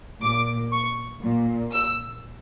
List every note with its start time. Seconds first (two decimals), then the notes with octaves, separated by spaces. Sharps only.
0.22 A#2 D6
0.72 C#6
1.22 A#2
1.72 E6